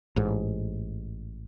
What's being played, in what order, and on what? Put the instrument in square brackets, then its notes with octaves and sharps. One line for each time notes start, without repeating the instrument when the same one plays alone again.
[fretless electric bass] A1 G#2